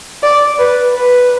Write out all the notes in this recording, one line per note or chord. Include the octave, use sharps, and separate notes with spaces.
D5
B4
B4